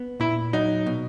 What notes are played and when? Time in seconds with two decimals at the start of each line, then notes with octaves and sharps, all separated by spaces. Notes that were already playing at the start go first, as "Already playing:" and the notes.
Already playing: B3
0.20 A#2 E4
0.53 F#3 D#4
0.86 B2